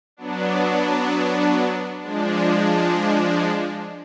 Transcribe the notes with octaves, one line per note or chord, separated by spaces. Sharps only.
F#3 B3 D4
F3 G#3 D4